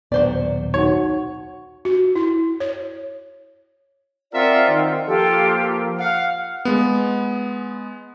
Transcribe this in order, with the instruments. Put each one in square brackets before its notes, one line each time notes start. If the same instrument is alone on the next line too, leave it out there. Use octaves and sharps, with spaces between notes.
[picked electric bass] D#1 B1 B3 [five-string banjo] F#3 C5 D5
[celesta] D#4 F#4 F#5 [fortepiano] C#5
[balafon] F#4
E4
C#5
[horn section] C4 A#4 E5 [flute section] F4 D5 F#5
[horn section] D#3 C4
[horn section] F3 A#3 [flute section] F4 G4 A4
[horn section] F5 [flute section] F#5
[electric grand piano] G#3 B3